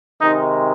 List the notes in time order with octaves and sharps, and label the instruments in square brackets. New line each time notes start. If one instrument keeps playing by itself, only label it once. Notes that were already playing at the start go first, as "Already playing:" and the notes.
[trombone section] C3 D#3 G#3 D#4